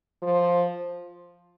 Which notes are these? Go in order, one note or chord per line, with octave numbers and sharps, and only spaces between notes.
F3